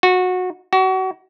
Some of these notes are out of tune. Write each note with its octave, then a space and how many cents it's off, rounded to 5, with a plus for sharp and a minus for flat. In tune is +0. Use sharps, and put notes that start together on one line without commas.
F#4 -20
F#4 +30